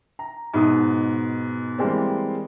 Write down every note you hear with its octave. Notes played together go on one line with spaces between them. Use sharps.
A#5
G#2 B2 D#4 D#6
E3 G3 G#3 A#3 C4